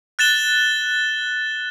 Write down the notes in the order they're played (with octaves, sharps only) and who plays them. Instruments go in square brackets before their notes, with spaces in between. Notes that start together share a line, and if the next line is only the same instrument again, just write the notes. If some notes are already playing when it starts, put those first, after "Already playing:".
[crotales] F#6 A6 E7 G7